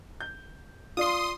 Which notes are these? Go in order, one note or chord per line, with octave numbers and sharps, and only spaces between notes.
G6
F4 D5 C6 D#6